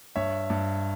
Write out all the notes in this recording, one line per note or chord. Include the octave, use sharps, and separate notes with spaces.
G2 C#5 E5
G2